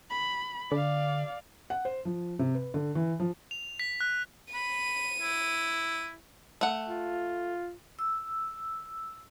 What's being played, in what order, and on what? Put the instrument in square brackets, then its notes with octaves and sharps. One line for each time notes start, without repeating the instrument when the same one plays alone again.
[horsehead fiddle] B5
[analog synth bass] D3 [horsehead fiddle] D5 F5
[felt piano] F#5
C5
F3
C3
B4
D3
E3
F3
[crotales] F7
B6
F#6
[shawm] B5 [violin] D#7
[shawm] E4
[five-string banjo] A3 F#5
[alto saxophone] F4
[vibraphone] E6